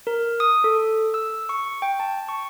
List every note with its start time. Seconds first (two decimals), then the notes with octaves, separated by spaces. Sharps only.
0.07 A#4
0.40 D#6
0.64 A4
1.14 E6
1.49 C#6
1.82 G5
2.00 A5
2.29 C#6